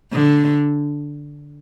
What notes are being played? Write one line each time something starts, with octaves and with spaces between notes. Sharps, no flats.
D3